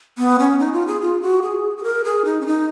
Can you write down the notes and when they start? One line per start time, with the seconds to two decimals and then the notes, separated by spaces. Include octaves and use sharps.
0.18 B3
0.40 C#4
0.59 D#4
0.73 F4
0.87 G#4
1.02 F4
1.22 F#4
1.42 G#4
1.77 G#4
1.83 A#4
2.04 G#4
2.25 D#4
2.41 C#4
2.46 D#4